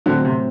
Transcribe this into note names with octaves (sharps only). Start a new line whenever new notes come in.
A2 D3 F#3 C4
C3